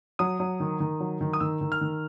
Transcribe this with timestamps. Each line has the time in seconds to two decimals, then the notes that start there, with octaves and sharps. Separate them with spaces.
0.19 F#3 D#6
0.40 F#3
0.60 D#3
0.80 D#3
1.00 F#3
1.21 D#3
1.33 D#6
1.40 D#3 E6
1.61 D#3
1.72 F6
1.81 D#3